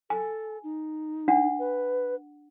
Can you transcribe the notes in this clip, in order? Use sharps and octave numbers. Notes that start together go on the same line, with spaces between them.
A4 G#5
D#4
D4 F#5
B4